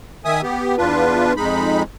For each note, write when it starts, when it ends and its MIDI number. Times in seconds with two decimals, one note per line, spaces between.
0.25 0.41 51
0.25 0.41 76
0.25 0.41 80
0.25 0.41 87
0.43 0.76 59
0.43 0.76 67
0.78 1.33 40
0.78 1.33 62
0.78 1.33 65
0.78 1.33 71
1.37 1.83 41
1.37 1.83 56
1.37 1.83 63
1.37 1.83 83